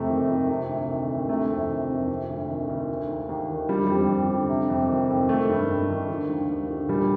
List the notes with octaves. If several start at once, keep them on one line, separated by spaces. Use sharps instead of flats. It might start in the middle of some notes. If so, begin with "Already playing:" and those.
Already playing: F2 C3 A3
D#3
F2
C3
D2
D#3
D2
C3 A3
F2
D#3
F2
C3
D2
D#3
D2
D#3
D#2
D#2
D#3
D3 G3
F2 G3
F2
D3
C3
F2
D#3
F2
D#3 A3
G2
G2
D#3
D3
D#2
D#2
D3
A#2 G3